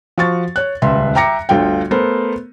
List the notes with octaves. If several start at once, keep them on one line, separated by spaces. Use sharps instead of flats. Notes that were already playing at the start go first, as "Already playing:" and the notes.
F3 F#4 C#6 A6
C#5 F#6
D#1 C#2 B4 E5 C6
E5 G5 A#5 D6 A#6 C#7
G1 D2 A3 F4 G5
A3 B3 A#4 C5